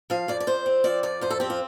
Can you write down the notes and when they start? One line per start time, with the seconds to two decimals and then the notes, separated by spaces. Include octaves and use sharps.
0.10 F3 F5
0.28 F2 D5
0.40 D5
0.47 F2 C5
0.66 C4
0.84 F3 D5
1.03 F2 D5
1.21 F2 C5
1.30 A4
1.40 C4 G4
1.50 F4